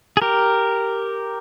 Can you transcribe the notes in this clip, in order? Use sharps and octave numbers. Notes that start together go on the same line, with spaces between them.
G#4
G4 A#4